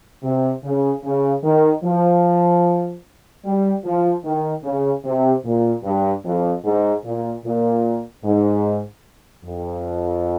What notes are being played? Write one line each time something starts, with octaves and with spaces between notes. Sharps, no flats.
C3
C#3
C#3
D#3
F3
G3
F3
D#3
C#3
C3
A#2
G2
F2
G#2
A#2
A#2
G#2
F2